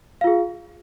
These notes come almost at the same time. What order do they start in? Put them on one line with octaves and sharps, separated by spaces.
F5 F4 G#4